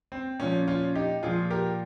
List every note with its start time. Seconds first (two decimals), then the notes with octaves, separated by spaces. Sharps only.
0.12 C4
0.40 A#2 F3 C#4
0.68 C#4 F4
0.95 D#4 G4
1.23 A#2 F3 F4 G#4
1.50 G4 A#4